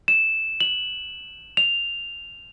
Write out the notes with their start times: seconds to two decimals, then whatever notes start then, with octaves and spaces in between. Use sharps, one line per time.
0.08 E7
0.60 F#7
1.57 F7